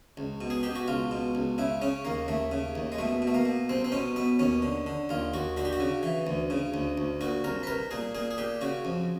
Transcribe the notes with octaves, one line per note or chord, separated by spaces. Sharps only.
C#2
B2
G#4
B2 G4
F#4
C#2 F4
B2
C#2
C#3 E4
C#3 C#4
D#2 A#3
D#2 A3
C#3
D#2
G#3
B2 A3
B2
A3
A#3
B2
C2 C4
C4
B2 C#4
B2 B3
D#2 C#4
D3
D3
D#2 F4
D#2 F#4
D3 F#4
G4
F#4
C#3
E3
D2
C#3
D2
D2
A#2 F#4
C2 A#4
B4
C2 A#4
A#2 G#4
A#2 G#4
G#4
A#2 G4
C#3 F#4
F2